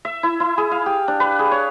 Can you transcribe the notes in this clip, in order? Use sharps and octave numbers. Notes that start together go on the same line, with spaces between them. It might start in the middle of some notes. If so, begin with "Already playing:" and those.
E5
E4
E4
G#4
F5
G4
D4
B4
G#4
C#5